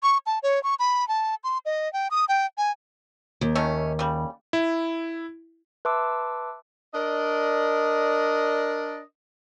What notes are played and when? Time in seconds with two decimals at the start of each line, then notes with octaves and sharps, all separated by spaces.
0.03 C#6
0.26 A5
0.43 C#5
0.63 C#6
0.79 B5
1.08 A5
1.44 C6
1.65 D#5
1.93 G5
2.11 D#6
2.29 G5
2.58 G#5
3.41 D#2
3.55 D#3 A3 C#4
3.99 C#3 G3
4.53 E4
5.85 B4 E5 A5 C6 D6 E6
6.94 D4 A#4 D5 D#5